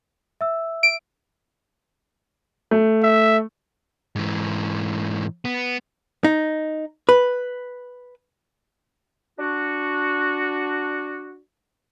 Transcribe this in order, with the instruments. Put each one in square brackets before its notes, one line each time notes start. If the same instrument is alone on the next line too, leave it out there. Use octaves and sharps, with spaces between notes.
[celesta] E5 E6
[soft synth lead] D7
[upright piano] A3
[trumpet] E5
[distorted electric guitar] G#2 E3
B3
[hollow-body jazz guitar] D#4
B4
[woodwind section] D4 F#4